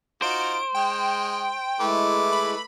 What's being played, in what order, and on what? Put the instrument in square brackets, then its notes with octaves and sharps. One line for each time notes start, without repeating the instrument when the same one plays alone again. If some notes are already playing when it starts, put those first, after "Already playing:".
[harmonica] D#4 F4 F#4 [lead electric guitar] C5 [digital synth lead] D7
[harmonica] G#3 [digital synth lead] G5
[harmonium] G#3 E4 [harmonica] A3 B4 D6
[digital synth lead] B5